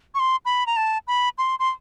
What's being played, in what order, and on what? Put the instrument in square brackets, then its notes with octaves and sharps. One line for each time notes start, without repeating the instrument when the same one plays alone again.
[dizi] C#6
C6
B5
A#5
A5
B5
C6
C6